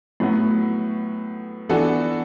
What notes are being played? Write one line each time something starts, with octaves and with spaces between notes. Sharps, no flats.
A2 F#3 B3 F#4
E3 B3 D4 F#4 A4